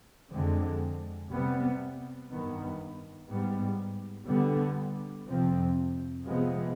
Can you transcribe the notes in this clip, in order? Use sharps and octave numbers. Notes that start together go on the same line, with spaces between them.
F2 D3 G#3 C4
C3 G3 B3
G2 D#3 B3
G#2 G3 B3
D3 G3 B3
F2 C3 F3 C4
C3 F3 G#3 B3